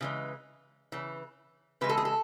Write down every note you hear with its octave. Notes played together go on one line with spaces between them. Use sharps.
C#3 E3 G#3
C#3 E3
C#3 E3 G#3 B4
A4
G#4
A4